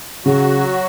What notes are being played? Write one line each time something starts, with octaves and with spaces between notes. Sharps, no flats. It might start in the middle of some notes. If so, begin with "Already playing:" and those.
C#3 F#3 F#4